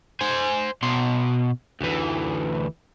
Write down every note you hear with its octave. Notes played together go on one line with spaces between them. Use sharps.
C5 G#5
B2 C6
D2 E3